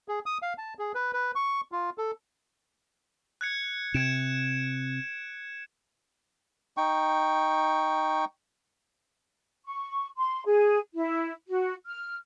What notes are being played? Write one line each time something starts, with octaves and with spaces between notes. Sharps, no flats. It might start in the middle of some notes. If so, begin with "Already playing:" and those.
G#4
D#6
F5
A5
G#4
B4
B4
C#6
F4
A4
F#6 G#6 C#7
C3 G#6 D7 E7
D#4 G5 C#6
C#6
C6
G#4
E4
F#4
F6